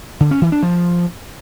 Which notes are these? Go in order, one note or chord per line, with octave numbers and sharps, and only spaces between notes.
D3
C#4
E3
D4
F3